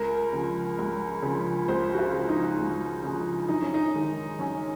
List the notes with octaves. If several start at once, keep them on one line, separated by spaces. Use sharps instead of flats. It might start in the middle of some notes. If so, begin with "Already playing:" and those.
Already playing: C#2 A#4
C#3 F3
C#2
C#3 F3
C#2 C5
F#4
F4
C#3 F3
D#4
C#2
C#3 F3
F#2 D#4
C#4
D#4
D#3 G#3
F#2 C#4